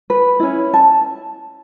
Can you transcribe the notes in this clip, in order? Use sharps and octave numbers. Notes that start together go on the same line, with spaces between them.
B4
C#4 E4
A5